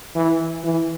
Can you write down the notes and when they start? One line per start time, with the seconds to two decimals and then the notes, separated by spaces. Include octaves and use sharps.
0.15 E3
0.64 E3